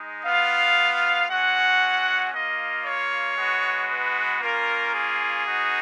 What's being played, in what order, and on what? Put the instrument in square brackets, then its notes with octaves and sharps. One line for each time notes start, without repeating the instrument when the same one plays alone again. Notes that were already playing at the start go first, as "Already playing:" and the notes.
Already playing: [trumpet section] G#3 D#4
B3 F4 F5
G#3 C#4 F#4 F#5
A#3 F4 D#5
C#5
G#3 B3 F#4
B4
A#3 C#4 F4 A#4
G#4
B3 D#4 F#4